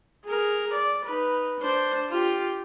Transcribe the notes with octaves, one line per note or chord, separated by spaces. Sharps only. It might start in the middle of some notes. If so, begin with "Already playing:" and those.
G#4 A#4
D5
D#4 B4
D4 C5
F4 G4